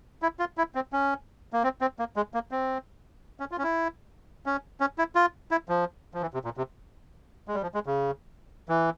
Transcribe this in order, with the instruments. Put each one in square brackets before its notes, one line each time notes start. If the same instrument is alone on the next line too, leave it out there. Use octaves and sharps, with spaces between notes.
[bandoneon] E4
F4
E4
C4
C#4
A#3
C4
C4
A#3
G#3
A#3
C4
C#4
F4
C#4
E4
C#4
C#4
E4
F4
E4
F3
F3
E3
C3
A#2
C3
G#3
G3
F3
G#3
C#3
E3